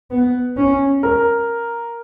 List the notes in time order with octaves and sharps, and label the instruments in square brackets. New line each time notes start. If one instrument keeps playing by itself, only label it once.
[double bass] B3
C#4
[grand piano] A#4